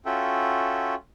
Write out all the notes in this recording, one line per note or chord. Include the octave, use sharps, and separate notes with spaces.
C#4 F4 F#4 A4 E5 G5